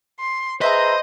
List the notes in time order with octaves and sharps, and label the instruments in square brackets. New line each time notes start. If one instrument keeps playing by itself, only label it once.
[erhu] C6
[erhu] G#4 [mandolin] B4 E5 A#5 [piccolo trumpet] C5 [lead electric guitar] D#5